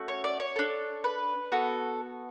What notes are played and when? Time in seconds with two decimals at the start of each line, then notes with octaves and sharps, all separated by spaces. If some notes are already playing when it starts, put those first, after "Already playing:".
Already playing: A3 C#4 F#4
0.08 C#5
0.24 D5
0.40 C#5
0.56 D4 A4
1.04 B4
1.52 B3 F#4 A4